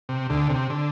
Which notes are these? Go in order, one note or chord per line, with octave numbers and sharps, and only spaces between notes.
C3
D2 D3
C3
D3